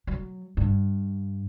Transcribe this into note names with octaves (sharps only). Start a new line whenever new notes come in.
F#3
G2